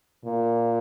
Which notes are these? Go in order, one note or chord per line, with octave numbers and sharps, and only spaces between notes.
A#2